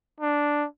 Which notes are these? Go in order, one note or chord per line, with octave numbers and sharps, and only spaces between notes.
D4